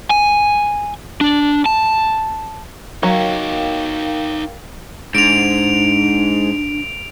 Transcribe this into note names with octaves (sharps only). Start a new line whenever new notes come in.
G#5
D4
A5
F#3 D#4 A#4 C#5 F5 G5
G#2 D4 D7 F7